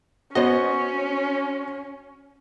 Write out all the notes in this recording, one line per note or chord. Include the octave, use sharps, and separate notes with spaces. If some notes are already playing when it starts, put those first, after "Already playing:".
B3 C#4 F#4 C5 C#5 D#5